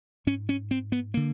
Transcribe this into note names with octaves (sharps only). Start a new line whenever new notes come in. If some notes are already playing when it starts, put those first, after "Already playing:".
G#2 C#4
C#4
C4
B3
D3 A#3